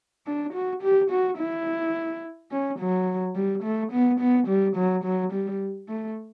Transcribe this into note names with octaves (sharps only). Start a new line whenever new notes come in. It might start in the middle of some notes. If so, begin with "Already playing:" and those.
D4
F#4
G4
F#4
E4
C#4
F#3
G3
A3
B3
B3
G3
F#3
F#3
G3
A3